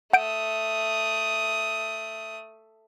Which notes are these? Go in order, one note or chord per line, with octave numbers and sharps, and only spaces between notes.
A3 F#5 D#6 G6 D7